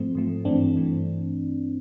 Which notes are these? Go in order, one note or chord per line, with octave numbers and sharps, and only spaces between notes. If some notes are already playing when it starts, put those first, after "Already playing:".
Already playing: G#2 F3 A3 C4
G#2 F3 A3
G2 E3 A3 C4 D4
G2 E3 A3